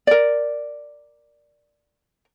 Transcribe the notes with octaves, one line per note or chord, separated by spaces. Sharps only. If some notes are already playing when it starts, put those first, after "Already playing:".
A#4 D5